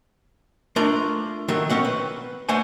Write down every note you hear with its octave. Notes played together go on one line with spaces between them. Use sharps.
A3 D4 F4 A#4 A#5
D#3 F#3 A3 A4 A#4
D#3 F3 C4 C#4 F#5
B4
A3 B4 C5 F#5 G#5